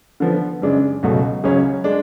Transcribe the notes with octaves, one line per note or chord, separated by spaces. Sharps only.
D3 F3 B3
F#2 C#3 G#3 D4
C#2 B2 F#3 A3
C#2 C#3 F#3 C#4
G#3 D4